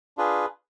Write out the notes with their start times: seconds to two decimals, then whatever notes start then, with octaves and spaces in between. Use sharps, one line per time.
0.18 D4 F4 G#4 B4